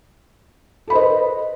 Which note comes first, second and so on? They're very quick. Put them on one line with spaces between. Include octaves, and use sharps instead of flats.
A4 B5 C5 D#5 B4